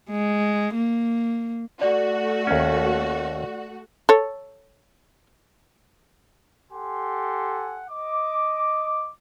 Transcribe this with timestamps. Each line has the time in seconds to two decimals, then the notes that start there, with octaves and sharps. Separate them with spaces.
0.10 G#3
0.75 A#3
1.81 A3 F#4 D5
2.47 D#2 C#4
4.09 A4 C#5
6.72 G4 A4 F#5 G#5 C6
7.90 D#5 D6